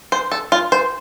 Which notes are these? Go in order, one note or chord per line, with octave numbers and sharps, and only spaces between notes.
C5
A4
F4
C5